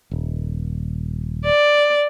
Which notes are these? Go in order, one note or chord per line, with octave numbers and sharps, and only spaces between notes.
D#1
D5